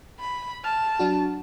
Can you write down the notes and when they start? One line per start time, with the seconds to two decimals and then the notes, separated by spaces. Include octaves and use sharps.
0.20 B5
0.64 A5 F6
0.99 F#3 D4 F#4